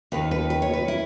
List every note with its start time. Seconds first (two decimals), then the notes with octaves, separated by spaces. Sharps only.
0.12 D#2 D#3 B4
0.31 B4
0.50 B4
0.62 C#5
0.73 B4
0.88 E4